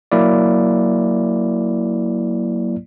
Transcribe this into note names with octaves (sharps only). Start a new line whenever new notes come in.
F#3 A#3 E4 D5